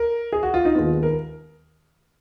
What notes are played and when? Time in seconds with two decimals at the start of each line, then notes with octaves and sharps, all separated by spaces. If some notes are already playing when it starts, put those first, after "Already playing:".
Already playing: A#4
0.33 G#4
0.43 F#4
0.54 F4
0.65 D#4
0.75 D#2 D#3 G#3 B3 F4
1.03 A#4